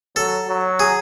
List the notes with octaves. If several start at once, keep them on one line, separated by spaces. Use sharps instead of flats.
F#3 A4
F#3
G#4